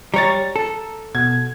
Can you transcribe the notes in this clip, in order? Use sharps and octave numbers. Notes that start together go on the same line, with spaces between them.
G3 C#5 A#5 A6
A4
B2 G#6